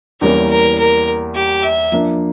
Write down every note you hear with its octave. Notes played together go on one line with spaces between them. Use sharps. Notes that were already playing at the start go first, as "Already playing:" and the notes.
E2 E3 G3 A#3 C#4 A#4
A#4
A#4
G4
E5
F3 A#3 D4